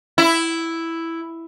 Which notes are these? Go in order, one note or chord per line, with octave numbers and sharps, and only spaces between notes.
E4